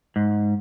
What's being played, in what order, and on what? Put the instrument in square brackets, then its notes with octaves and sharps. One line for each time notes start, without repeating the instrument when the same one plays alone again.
[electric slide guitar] G#2